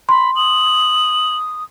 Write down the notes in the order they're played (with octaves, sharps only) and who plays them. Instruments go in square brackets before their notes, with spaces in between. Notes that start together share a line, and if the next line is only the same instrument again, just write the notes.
[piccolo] B5 [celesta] C6
[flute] D#6 [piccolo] F#7